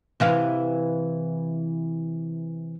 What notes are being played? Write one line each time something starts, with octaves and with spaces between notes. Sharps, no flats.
C3 E3 F5